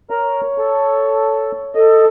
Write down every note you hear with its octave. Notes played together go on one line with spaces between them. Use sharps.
A#4 C#5 A#5
A4
A4 D#5